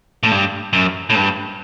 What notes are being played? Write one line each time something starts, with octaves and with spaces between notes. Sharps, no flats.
A2
G2
F#2
A2
G2